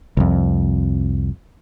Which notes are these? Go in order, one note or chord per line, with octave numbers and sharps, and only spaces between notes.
C2 F2